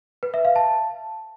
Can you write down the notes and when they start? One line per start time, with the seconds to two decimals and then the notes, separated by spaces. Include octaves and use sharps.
0.23 B4
0.34 E5
0.45 F5
0.56 A5